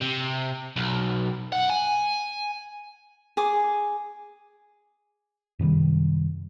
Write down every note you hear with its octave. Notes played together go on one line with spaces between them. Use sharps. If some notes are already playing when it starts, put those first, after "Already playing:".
C3
B1
F#2 F#5
G#5
G#4 D6
F#2 C3 D#3 G3